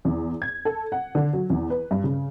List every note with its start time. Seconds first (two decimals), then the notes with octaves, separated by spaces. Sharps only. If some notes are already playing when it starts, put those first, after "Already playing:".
0.05 E2
0.42 G#6
0.65 A4
0.92 F#5
1.15 D3
1.33 F#3
1.50 E2
1.70 B4
1.91 G2
2.04 C#3